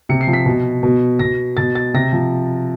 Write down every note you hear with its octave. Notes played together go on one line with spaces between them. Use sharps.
C3 C#7
C7
F3
B6
B2
B2
B2 A#6
B2 A6
A6
C3 A#6
F3